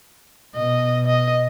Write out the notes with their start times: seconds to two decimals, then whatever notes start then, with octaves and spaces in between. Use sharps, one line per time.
0.55 B2 D#5
1.07 D#5